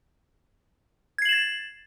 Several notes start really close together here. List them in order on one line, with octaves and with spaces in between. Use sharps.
G#6 C7 F#7 E7 A6